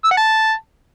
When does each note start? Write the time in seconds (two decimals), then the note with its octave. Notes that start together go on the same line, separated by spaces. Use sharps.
0.04 E6
0.11 F#5
0.17 A5